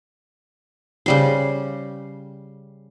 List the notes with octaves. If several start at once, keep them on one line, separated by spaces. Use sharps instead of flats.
C#3 G3 C5